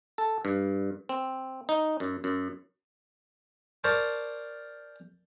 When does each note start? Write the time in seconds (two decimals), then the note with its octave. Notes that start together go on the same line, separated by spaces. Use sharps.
0.18 A4
0.45 G2
1.09 C4
1.69 D#4
2.00 F#2
2.24 F#2
3.84 A#4 C5 D5 A5 C#6